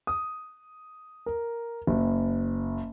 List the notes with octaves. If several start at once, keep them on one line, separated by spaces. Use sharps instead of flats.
D#6
A#4
F#1